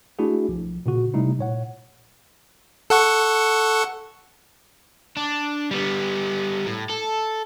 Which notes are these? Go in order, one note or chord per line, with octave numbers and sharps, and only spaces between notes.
A3 D4 E4 F#4 G#4
B1 F3
A#2 C#3 F#4
C3 G3 A3 D#4 E4
A#2 C#5 F#5
A4 F#5 C#6
D4
G3 B3
A2
A4